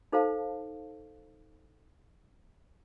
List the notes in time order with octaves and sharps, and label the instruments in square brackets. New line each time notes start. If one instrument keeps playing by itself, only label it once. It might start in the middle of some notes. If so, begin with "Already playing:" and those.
[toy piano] D#4 A4 C5 F5 A5